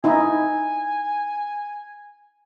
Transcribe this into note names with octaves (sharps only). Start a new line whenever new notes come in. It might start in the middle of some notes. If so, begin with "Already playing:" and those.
D#4 E4 G#5